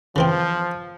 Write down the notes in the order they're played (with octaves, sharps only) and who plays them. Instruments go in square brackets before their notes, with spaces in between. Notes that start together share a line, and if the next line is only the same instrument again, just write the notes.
[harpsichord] C#3 E3 C4 [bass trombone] F3